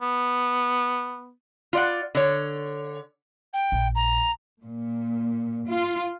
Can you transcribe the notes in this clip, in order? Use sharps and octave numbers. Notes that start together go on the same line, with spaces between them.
B3
F4 D5 F#5
D3 C#5
G5
A#1
A#5
A#2
F4